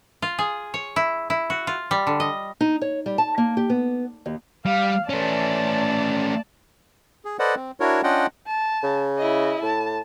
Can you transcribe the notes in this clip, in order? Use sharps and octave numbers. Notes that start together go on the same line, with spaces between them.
F4
G#4
C#5
E4
E4
F#4
F4
G3
D3
D#5
D#4
C#5
G3
A5
A#3
G4
B3
D#2
G3 F5
A3 C#4 D5 A5
G#4
A4 B4 C5 D5 D#5 F#5
C4
D4 E4 F#4 A#4 C#5
C#4 D4 F4 D#5 F#5 G5
A5
C#3
E4 D#5
A2 A5